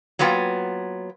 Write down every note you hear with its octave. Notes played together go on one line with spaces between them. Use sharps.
F#3 A#3 B3 F4 G5